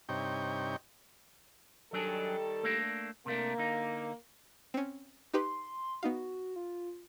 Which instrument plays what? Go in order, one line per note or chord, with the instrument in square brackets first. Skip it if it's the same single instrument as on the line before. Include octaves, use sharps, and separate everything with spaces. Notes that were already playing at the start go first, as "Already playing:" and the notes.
[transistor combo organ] G2 C3 D#4 C#5 G5
[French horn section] D#3 G3 A4 [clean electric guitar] F#3 D4 G#4
[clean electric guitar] A3 A#3 D4
[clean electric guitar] C3 A3 D4 [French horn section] A#3
[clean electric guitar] D3 D#4
[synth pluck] C4 C#4
[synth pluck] D#4 G4 B4 [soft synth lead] C6
[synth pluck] B3 D#4 F5 [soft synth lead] F#4
[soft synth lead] F4